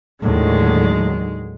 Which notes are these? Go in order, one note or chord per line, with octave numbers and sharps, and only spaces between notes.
D#2 A2 D3 D#3 F#3 G#3